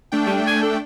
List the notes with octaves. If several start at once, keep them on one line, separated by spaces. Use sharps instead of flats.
A3 D4 G5
G3
G#5
A4